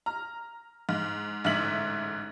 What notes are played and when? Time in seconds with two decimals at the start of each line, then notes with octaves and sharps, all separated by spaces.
0.06 A#5 F6
0.89 G#2
1.44 A1 G#2 D3 E5 B6 F#7